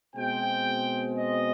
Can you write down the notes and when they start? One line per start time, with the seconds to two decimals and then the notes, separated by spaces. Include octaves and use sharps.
0.16 B2 G#3 C4 G5
1.18 D#5